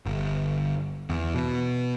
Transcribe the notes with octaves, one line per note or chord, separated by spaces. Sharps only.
G1
E2
B2